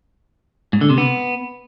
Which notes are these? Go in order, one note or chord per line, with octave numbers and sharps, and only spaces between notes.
G#2
D3
C3
B3